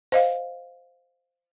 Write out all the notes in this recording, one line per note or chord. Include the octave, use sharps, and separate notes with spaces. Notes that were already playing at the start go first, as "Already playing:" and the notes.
C5 D#5 F5